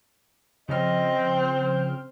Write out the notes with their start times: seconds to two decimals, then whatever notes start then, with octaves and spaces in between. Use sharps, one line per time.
0.69 C#3 F3 C4 D#5 F6
1.37 C5